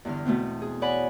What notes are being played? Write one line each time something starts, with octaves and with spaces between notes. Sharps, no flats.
E2 G2 D3 F6
B2 A3 B3 C4
G#4
C#5 D5 F#5 G#5 B5